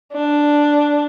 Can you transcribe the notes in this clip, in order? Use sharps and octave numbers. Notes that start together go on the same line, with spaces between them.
D4